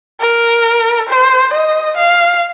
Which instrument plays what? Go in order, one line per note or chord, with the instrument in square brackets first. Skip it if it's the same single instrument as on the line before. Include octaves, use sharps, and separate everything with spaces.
[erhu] A#4
C5
D#5
F5